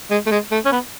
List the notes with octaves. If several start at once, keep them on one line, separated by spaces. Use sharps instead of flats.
G#3
A3
G#3
A3
C#4
B3